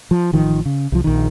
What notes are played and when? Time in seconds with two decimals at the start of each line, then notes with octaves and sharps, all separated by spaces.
0.11 F3
0.33 A1 D#3 F3
0.65 C#3
0.92 C2 F3
1.04 A#1 D#3